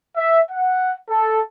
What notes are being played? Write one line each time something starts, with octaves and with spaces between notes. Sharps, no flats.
E5
F#5
A4